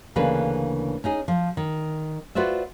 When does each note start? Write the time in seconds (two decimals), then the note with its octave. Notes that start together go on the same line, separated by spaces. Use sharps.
0.16 D2 C#3 E3 A#3 D4 B4
1.04 C#4 D#4 G#4
1.28 F3
1.57 D#3
2.35 F4 F#4 B4 C5 D5 E5